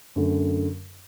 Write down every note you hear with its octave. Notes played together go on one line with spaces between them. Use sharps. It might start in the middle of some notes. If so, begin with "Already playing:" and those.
F#2 D3 A3